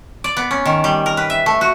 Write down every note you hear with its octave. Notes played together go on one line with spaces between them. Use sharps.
D5
B3
C#4
D#3
G3
A#4
B4
E5
A3
F#4